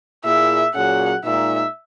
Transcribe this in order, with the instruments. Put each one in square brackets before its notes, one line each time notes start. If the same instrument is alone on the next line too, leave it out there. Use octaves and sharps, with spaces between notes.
[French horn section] A#2 A#3 E4 G#4 [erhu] E5
[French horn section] A#2 F#3 C#4 G#4 [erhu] F#5
[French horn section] A#2 G#3 D#4 [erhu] E5